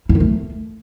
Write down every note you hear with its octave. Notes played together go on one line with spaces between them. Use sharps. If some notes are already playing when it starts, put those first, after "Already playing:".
E4
D#3
A3